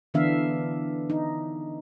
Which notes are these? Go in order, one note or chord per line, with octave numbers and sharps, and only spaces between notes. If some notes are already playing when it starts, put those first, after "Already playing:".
D3 E3 B3 D4 E5 F5
D#4